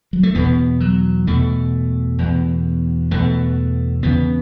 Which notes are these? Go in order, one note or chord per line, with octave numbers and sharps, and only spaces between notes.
F#3
A3
E2 B2 B3
F#3
E2 B2 A3
E2 B2
E2 B2 A3
E2 C#3 B3